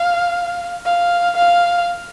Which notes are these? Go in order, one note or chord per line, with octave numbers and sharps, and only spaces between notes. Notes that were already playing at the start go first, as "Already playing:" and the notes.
Already playing: F5
F5
F5